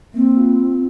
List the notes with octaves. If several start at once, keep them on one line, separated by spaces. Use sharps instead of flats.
A#3 C4
F4
F4